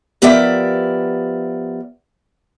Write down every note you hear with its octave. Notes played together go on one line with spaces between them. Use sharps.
F3 B3 G4 A#4 D5 E5